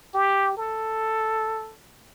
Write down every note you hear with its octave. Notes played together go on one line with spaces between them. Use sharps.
G4
A4